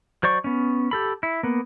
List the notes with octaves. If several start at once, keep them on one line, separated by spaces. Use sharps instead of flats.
F#3 C5 D5 C#6
B3 C#4
G4 A4 B5
E4
A#3 B3